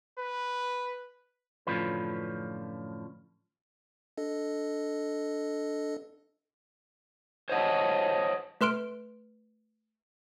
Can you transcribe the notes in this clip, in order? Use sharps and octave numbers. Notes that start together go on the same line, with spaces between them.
B4
F#2 A2 D3 F3 C#4 B4
D4 A4 D#5
C5 C#5 D#5 F#5 A5
A3 B4 C6 F6 D7